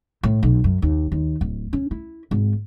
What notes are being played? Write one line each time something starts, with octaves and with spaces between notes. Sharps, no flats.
A2
B1
F#2
D#2
D#2
D1
C#4
E4
G#1